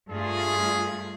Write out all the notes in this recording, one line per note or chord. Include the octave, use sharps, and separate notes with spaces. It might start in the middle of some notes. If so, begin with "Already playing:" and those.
G2 A3 F4 G#4